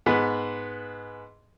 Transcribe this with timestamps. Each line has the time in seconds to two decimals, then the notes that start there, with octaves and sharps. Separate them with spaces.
0.06 G#2 B3